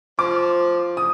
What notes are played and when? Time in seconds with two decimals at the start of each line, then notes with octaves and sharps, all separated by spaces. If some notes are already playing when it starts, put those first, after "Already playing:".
0.19 F3 D6
0.97 D#6